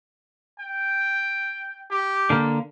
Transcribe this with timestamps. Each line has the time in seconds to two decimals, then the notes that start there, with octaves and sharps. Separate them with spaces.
0.59 G5
1.91 G4
2.30 D3 A#3